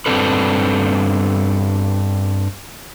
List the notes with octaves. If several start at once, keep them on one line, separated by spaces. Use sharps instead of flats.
G2 C#3 C4 D4 A4 B4